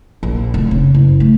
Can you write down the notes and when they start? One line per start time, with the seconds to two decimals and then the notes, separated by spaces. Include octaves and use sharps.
0.23 A#1
0.54 F1
0.71 C#3
0.94 F#1
1.20 A3